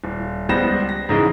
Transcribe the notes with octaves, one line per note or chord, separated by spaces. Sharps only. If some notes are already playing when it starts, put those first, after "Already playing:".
D#1
C#2 G3 B3 C5 A#6 E7
A#6
G#2 C#3 E3 G#3